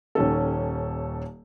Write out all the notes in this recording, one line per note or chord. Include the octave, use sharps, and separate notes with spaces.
D#1 D#2 C#4 A4